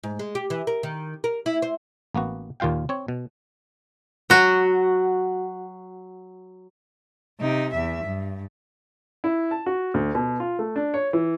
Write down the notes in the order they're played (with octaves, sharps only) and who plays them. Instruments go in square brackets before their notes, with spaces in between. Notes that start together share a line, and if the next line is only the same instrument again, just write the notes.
[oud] G#2
G#3
G4
E3
A#4
D#3
A#4
E4
C5
[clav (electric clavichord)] A1 A#3 B3 F#4
D#2 A#2 F4 F5 G5
C4 C#5
B2
[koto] F#3 F#4
[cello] C3 D#4
E2 E5
G2
[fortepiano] E4
A5
F#4
D2
B2
F4
A3
D4
C#5
E3